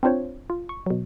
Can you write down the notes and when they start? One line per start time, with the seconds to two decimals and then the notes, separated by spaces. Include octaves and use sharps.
0.03 C4 D4 F4 C5 C#5
0.50 F4
0.69 C#6
0.86 B2 F#3